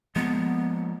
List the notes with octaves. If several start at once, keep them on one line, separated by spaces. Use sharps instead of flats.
F3 G#3 A#3 B3